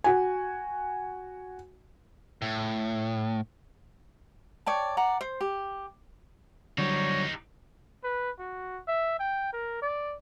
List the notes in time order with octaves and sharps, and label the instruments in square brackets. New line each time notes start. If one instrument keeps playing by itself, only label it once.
[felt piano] F#4 G#5
[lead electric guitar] A2
[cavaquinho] C#5 D5 G5 A5
D5 F#5 A#5
C5
G4
[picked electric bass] D3 F#3 G3 [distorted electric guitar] D#4 G4 [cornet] C#5
[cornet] B4
F#4
E5
G5
A#4
D5